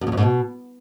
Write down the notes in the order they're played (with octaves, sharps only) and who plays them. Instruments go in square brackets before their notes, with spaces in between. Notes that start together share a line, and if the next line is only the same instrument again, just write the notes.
[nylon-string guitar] F#2
E2
F2
G#2
B2